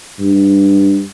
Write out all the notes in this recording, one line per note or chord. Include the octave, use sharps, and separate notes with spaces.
G2